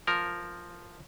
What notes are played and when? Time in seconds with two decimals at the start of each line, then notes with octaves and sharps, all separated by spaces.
0.07 F3 A#4